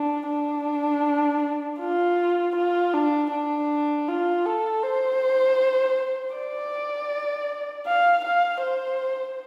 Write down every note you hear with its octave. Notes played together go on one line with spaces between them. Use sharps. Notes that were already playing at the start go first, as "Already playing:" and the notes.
Already playing: D4
D4
F4
F4
D4
D4
F4
A4
C5
D5
F5
F5
C5